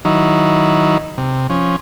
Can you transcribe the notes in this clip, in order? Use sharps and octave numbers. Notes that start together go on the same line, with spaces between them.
D#3 F#3 D#4 E4
C3
F3 C#4